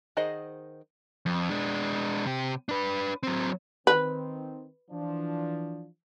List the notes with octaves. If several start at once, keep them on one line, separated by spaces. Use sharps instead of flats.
D#3 G#4 C5 D#5 F#5
F2
G#3 D4
C3 G4
D4 B4
F#3 C4
D#3 C4 B4
E3 F3 D4